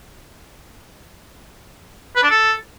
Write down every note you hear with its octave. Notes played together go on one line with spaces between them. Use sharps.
B4
D4
A4